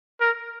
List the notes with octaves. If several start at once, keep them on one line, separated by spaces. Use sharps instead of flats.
A#4